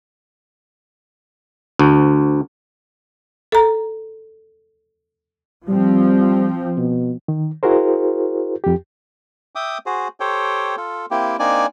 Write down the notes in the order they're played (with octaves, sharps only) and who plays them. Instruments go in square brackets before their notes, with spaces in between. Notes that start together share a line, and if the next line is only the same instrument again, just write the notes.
[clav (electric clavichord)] D2
[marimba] A4 A#5
[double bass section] F3 C4 [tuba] G3
[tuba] B2
[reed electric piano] D#3
E4 F#4 G#4 A#4 C5
F2 G4
[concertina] E5 G5 D6 D#6
F#4 G#4 C5
G4 A4 C5 C#5 G5
F4 A4
A#3 C4 E4 G4
A#3 C4 D4 D#4 D5 G#5